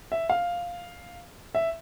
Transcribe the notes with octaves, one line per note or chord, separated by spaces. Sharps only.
E5
F5
E5